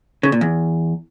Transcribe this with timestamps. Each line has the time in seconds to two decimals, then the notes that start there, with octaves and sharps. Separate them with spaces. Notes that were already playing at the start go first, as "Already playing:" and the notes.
0.23 C#3
0.32 A#2
0.41 E2